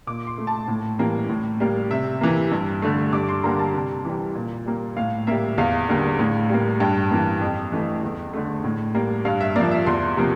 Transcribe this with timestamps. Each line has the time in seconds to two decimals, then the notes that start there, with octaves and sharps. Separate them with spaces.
0.07 A#2 D6
0.27 C6
0.38 A3
0.47 A5
0.68 A2
0.99 E3 G3 A#3
1.29 A2
1.60 G3 A#3
1.90 C3 E5
2.21 E3 A#3
2.52 G2
2.82 D3 A3
3.13 G2 D6
3.28 C6
3.44 D3 G3 A#3 A#5
3.59 A5
3.74 C3
4.05 E3 G3
4.35 A#2
4.66 G3 A#3
4.97 A2 F5
5.27 G3 A#3 E5
5.58 E2 F5
5.89 D3 G3 A#3
6.19 A2
6.49 G3 A#3
6.80 G2 G5
7.11 E3 A#3
7.41 F2
7.72 E3 A3
8.03 E2
8.33 D3 A3
8.64 A2
8.94 G3 A#3
9.25 G2 F5
9.41 E5
9.56 F3 A#3 D5
9.71 E5
9.86 E2 C6
10.17 C3 F3 A#3